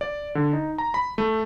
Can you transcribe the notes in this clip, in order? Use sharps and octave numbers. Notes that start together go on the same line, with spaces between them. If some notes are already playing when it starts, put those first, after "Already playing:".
D5
D3
D#4
A#5
B5
A3